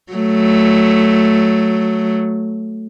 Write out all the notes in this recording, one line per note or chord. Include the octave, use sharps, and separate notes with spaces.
F#3 A3